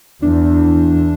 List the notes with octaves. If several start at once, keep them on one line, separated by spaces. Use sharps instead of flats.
E2 D4